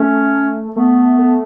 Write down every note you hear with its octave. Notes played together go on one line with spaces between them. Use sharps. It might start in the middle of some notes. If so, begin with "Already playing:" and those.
Already playing: A3 C#4
A3 B3
A3